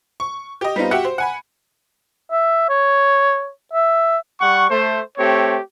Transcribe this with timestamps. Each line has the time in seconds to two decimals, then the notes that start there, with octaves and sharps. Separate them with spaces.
0.20 C#6
0.61 G4 D#5
0.76 G3 B3 C4 D#4 F4
0.91 F#4 G4 E5 F#5
1.05 C5
1.18 F#5 G#5 B5
2.31 E5
2.69 C#5
3.73 E5
4.41 G3 F#5 C#6
4.70 A3 C5
5.18 A3 C4 G4 C#5